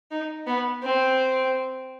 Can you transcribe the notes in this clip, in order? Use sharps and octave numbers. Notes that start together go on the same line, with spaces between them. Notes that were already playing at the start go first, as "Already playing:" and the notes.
D#4
B3
C4